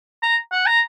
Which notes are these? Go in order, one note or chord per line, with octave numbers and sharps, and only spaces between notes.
A#5
F#5
A#5